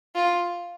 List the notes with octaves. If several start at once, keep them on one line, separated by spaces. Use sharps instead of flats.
F4